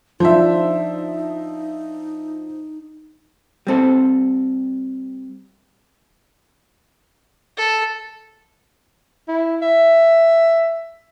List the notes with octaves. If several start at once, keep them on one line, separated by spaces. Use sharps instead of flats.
F3 D4 D#4 F4 C5 E5
G3 C4 A4
A4
E4
E5